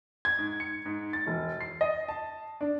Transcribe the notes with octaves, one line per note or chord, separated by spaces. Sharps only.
G#6
G#2
C#7
G#2
A6
E1
C7
D#5
A5
D4